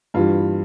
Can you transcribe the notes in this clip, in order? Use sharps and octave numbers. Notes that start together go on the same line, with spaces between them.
G2 E3 G3 F4